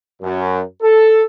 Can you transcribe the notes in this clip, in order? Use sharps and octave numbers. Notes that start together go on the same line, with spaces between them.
F#2
A4